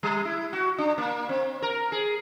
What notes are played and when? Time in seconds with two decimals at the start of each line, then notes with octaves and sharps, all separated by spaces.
0.03 G3
0.25 E4
0.53 F#4
0.78 D4
0.98 A#3
1.29 C4
1.62 A#4
1.92 G#4